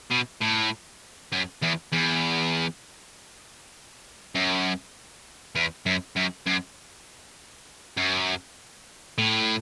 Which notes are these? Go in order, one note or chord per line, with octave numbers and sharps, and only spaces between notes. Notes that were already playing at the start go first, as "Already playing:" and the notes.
B2
A2
F#2
E2
E2
F#2
E2
F#2
F#2
F#2
F#2
A2